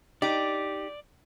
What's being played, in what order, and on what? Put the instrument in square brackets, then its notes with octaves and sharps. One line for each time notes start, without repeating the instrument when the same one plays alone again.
[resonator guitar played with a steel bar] D#4 G4 [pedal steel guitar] D5